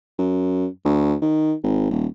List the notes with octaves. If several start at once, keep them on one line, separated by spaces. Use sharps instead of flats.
F#2
D2
D#3
G#1
D#1